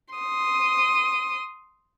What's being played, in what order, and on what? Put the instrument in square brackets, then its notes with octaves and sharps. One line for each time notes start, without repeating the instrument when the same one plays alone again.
[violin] C6 D#6